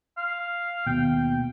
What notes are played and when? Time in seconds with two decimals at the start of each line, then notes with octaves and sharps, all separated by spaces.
0.17 F5
0.86 D#2 B2 G5